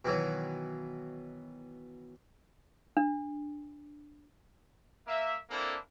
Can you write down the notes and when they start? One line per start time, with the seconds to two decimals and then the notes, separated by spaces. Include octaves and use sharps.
0.05 B2 D#3 E3 F#3
2.97 D4
5.07 A#3 E5
5.50 A#3 C4 D4 E4 A4